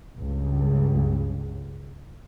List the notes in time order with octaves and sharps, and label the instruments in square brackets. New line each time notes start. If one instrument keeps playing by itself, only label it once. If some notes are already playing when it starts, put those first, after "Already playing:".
[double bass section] C#2 G2 C#3